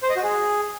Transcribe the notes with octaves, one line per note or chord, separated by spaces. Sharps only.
C5
D#5
F#4
G#4